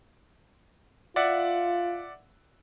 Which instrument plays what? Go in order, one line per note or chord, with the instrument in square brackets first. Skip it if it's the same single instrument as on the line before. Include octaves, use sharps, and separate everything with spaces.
[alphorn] F4 [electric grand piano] D5 E5 F#5